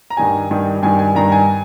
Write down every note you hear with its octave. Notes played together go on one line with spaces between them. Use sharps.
A#5
G2 D#3 G3 G#5
G2 D#3 G3
G2 D#3 G3 G#5
G#5
G2 D#3 G3 A#5
G#5